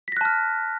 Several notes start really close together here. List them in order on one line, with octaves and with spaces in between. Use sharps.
B6 A#6 F#6 A5 F6